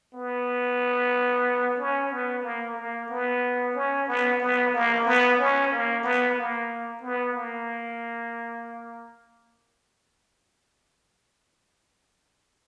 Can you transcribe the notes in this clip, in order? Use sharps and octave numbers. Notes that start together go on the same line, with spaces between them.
B3
C#4
B3
A#3
A#3
B3
C#4
B3
B3
A#3
B3
C#4
A#3
B3
A#3
B3
A#3